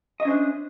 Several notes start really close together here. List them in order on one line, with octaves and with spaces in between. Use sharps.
D#5 E5 C#4 C5 D4